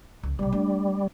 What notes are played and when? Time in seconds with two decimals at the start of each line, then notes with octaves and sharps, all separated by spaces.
0.23 C#2
0.39 B1 C3 G3
0.52 A3 D4